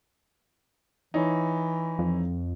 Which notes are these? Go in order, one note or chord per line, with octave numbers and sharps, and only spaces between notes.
E3 D#4 E4 C#5
F2